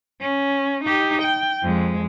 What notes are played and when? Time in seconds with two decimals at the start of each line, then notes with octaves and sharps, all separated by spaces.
0.21 C#4
0.84 D#4 G4
1.22 G5
1.63 F2 G#3